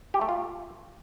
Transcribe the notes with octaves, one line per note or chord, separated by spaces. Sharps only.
G4
A3
F4